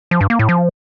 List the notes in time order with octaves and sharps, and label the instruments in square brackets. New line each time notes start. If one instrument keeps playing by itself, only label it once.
[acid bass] F3
G2
A#3
A2
F3